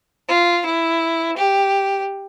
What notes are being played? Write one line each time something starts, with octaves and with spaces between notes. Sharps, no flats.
F4
E4
G4